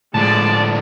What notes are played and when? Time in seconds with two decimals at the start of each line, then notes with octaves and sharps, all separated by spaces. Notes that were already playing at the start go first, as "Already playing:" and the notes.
0.14 A2 D3 F3 G#3 D5 A5